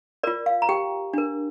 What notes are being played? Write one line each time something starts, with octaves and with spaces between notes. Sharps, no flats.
F4 A#4 D5
F5
A#5
G4 G5
D4 A#4